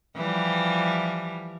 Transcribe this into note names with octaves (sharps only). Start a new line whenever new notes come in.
E3 F3 G3